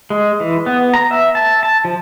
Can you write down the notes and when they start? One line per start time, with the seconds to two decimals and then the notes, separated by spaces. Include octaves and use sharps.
0.10 G#3
0.40 E3
0.66 B3
0.94 A#5
1.11 E5
1.35 A5
1.63 A5
1.85 F3